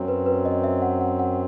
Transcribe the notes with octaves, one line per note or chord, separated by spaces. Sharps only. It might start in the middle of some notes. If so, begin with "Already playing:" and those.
Already playing: F#2 F#3 C4
B4
B4
D#5
E5
F#5
F#5
F#5